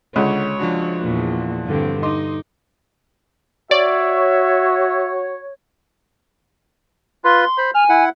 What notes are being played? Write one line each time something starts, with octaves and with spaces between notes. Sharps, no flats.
C#2 D3 C#5 F#5
F3 D4 F#4
E2 A#2
G2 D3 C4
D#4 D#5 C6 D6
F#4 C#5 D5 E5
F4 B4 C6
C5 B5
G#5 F6
E4 F#5